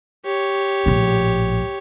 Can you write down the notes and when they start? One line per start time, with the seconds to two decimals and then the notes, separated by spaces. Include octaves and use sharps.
0.25 G4 C#5
0.86 A#1 A2